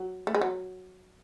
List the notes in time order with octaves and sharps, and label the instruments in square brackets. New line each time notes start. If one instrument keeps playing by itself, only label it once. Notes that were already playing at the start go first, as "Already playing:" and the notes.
Already playing: [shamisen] F#3
A3
G#3
F#3